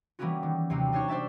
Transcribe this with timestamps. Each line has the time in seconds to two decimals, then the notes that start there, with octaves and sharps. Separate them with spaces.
0.19 E3 G3 A#3 B3 C#4 F#4
0.43 D#3
0.70 D#2 C3 F#3 G3 C4
0.92 D4 D#4 C5 C#5 C#6
1.08 C5 D5 E5 A5